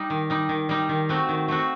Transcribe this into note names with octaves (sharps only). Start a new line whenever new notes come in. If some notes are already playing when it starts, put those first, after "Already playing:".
Already playing: G3 D#4
D#3
G3 D#4
D#3
G3 D#4
D#3
A3 C4 F#4
D#3
A3 C4 F#4